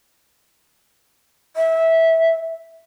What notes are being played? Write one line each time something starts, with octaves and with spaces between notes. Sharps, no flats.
E5